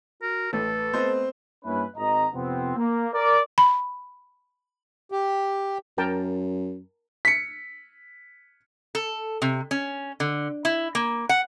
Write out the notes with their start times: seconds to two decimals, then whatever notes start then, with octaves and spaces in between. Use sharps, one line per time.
0.22 F#4 A#4
0.53 A1 A3 A4 B4
0.94 A3 B3 C4 C5 D#5
1.65 G2 A#3 C#4 E4 B4
1.97 G#1 D#5 A#5
2.34 F2 C3 B3 C4
2.77 A#3
3.14 A#4 D5
3.58 B5
5.12 G4
5.98 F#2 A#4 G5 A5
7.25 B6 C#7
8.95 A4
9.42 C3
9.71 C#4
10.20 D3
10.65 E4
10.95 A#3
11.29 F#5